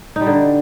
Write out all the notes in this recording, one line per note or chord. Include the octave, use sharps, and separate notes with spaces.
D#4
G3
D3